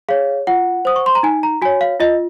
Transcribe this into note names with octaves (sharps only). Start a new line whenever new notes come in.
G#4 C#5 F5
F4 F#5
C5 D#6
C#6
C6
A#5
D#4 G#5
A#5
F#4 C#5 G#5
F5
F4 D#5